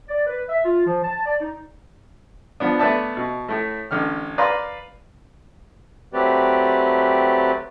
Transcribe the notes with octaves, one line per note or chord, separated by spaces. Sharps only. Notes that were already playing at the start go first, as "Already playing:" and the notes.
D5
B4
E5
F4
F3
A5
D5
D#4
F3 B3 D4
A3 B3 B4 D5 E5 A5
B2
A2 A3
A1 D3 F6
B4 D5 F5 A#5 C6
F#3 A3 C4 G4 B4 D5